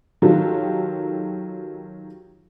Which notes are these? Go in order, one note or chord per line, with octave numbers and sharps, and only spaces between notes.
D#3 F#3 F4 G4 A4